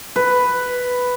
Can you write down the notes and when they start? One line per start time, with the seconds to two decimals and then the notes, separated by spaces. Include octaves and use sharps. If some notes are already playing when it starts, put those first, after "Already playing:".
0.16 B4